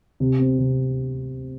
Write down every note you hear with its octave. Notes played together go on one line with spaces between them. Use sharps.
C3
C4
C3